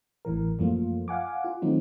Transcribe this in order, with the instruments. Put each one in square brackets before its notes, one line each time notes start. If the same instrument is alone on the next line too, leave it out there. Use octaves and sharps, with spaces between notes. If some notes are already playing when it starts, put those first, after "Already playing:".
[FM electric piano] A1 A2 E3 A#4
F#2 F3 A3 A#3 F4
F5 F#5 G#5 D6
F4
D#3 F#3 A3 C4 D#4